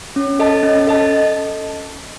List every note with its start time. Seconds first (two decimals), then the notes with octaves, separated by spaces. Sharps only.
0.16 C#4
0.39 A4 D#5 A5
0.63 C#4
0.87 A4 D#5 A5